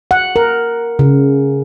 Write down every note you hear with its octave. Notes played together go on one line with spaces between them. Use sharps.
F#5
A#4
C#3